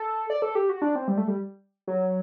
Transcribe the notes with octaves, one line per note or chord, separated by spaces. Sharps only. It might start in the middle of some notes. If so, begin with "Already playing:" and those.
Already playing: A4
D5
A4
G4
F#4
D4
C4
G3
A3
G3
F#3